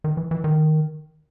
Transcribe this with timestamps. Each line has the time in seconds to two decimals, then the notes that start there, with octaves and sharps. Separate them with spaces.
0.04 D#3
0.17 E3
0.31 E3
0.44 D#3